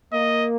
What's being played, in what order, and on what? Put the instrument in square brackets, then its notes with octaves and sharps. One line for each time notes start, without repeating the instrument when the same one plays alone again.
[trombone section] A#3 [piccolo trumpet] D#5